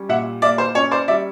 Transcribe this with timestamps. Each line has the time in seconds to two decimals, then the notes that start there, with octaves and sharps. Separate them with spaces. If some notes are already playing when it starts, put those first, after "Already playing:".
Already playing: G3 C#4
0.09 A#2 E5 F#5
0.42 A#3 D5 E5
0.58 C5
0.75 C#4 C#5
0.91 C5 D5
1.08 G3 D5 E5